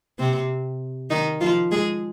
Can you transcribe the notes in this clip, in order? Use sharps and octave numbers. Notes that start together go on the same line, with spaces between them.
C3 C4
D#3 D#4
F3 F4
G#3 G#4